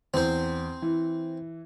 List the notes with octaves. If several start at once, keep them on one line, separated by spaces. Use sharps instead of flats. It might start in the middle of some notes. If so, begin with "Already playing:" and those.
E2 C4 C5
E3